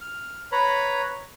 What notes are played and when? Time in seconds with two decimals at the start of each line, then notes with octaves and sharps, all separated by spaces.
0.01 F6
0.52 B4 C#5 A#5 B5